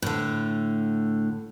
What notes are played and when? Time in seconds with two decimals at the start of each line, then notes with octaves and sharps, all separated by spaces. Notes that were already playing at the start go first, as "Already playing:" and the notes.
0.02 A2 D3